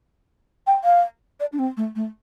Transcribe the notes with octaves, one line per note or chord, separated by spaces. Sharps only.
G5
F5
D5
D4
C4
A3
A3